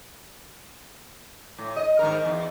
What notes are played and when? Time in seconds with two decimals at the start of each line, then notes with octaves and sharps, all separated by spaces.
1.58 A2
1.76 D#5
1.99 G#2 D#3 A#4
2.25 E2